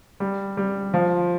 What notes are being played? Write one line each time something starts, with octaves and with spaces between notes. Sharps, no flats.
G3
G3
F3